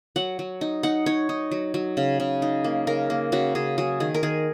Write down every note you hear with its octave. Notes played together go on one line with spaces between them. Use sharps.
F#3 F#5
F#3
D#4
D#4 F#5
D#4 C#5
D#4
F#3
F#3
C#3
C#3
D#4
A#3
C#3 A#4
A#3
C#3 F#4
C#3 G#4
F#3 G#4
D#3 G#4
A#4
D#3 G#4